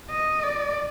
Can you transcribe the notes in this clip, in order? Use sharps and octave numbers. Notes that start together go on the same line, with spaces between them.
D#5
D5